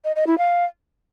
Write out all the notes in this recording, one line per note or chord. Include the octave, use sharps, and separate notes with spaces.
D#5
D#5
E4
F5